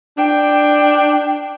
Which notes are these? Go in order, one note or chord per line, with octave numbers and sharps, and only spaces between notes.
D4 G5